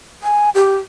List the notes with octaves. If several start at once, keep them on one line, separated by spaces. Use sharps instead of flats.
G#5
G4